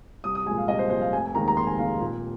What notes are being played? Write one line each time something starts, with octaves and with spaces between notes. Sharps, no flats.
C2 D#6
D#6
A#2 F3 G#3 G#5
F5
C2 D#5
C5
A#2 F3 G#3 C5
F5
F1 G#5
G#5
D#2 D#3 G#3 A#5
A#5
F1 C6
G#5
D#2 D#3 G#3 F5
A#2